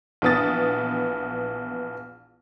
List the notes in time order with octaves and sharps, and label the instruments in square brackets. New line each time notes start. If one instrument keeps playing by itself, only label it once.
[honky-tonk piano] A#1 E3 B3 D#6 A6